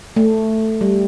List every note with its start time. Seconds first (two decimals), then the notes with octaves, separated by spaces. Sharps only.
0.16 A3
0.81 G3